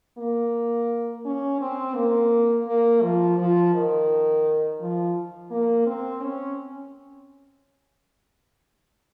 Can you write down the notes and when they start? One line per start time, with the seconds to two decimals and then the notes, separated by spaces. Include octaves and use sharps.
0.18 A#3
1.26 C#4
1.61 C4
1.96 A#3
2.68 A#3
3.02 F3
3.38 F3
3.74 D#3
4.80 F3
5.51 A#3
5.87 C4
6.22 C#4